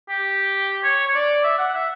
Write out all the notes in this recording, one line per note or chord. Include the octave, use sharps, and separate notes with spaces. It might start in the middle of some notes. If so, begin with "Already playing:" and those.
G4
C#5
C#5
D5
E5
F#5
E5